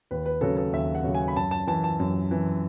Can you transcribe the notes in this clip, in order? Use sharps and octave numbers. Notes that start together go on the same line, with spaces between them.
D#2 B4
B4
C#3 F#3 A4
A4
D#2 E5
F#5
C#3 F#3
G#5
B5
F#2 A5
A5
E3 A5
A5
F#2
E3